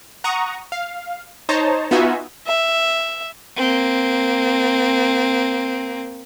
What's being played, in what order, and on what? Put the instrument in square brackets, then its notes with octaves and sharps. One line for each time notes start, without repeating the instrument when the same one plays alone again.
[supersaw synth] F#5 A#5 C#6 D#6
F5
D#4 C5 C#5 A5 A#5
B3 D#4 F4 F#4 E5 G#5
[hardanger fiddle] E5
[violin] A#3 C4